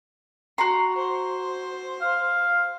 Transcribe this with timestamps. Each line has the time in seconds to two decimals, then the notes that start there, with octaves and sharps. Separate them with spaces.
0.58 F#4 A#5 C6
0.96 C5
2.02 F5